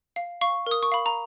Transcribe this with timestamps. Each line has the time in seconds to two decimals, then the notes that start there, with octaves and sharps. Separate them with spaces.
0.16 F5
0.41 F5 C#6
0.67 A#4 D#6
0.83 C#6
0.92 F5 B5
1.06 A#5